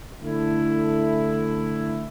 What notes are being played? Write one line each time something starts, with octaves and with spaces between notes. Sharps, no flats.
D3 A3 E4